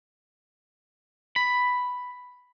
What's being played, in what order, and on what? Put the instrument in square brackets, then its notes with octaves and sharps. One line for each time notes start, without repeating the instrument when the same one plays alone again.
[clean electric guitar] B5